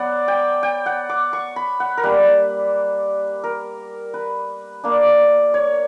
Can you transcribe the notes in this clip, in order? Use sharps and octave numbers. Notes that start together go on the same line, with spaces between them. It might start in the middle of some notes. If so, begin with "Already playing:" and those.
Already playing: F#3 B3 D5 F#5
G5
G5
F#5
D6
C#6
B5
F#5
A#4
G3 A#3 D4 B4
A#4
B4
A#3 D4
C#5